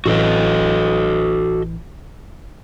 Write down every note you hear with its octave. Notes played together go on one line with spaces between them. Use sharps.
A1 E3 F#4 A4 D#5